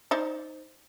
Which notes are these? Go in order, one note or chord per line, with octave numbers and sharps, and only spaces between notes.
D#4 C5 D5